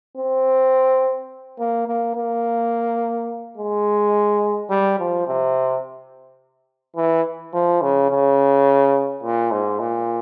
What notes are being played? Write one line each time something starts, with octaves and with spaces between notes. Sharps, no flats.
C4
A#3
A#3
A#3
G#3
G3
F3
C3
E3
F3
C#3
C#3
A#2
G#2
A#2